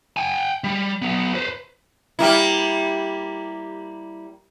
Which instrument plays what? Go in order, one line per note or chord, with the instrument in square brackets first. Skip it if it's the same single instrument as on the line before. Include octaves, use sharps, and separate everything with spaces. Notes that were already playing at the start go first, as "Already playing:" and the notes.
[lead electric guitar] G5 G#5
G3
F#3 B3
B4 C5
[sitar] G3 A#3 E4